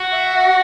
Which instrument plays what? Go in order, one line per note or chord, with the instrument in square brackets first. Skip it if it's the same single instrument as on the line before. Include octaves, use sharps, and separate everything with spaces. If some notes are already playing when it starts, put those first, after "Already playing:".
Already playing: [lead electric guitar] F#4
[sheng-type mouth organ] E5
F#5